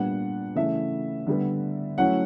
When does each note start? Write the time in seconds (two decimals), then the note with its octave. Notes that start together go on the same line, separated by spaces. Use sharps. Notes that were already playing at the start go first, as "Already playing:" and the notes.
Already playing: A#2 G3 B3 D4 F#5
0.55 C#3 E3 A3 E5
1.27 D3 G3 B3
1.98 F#3 A3 C#4 E4 F#5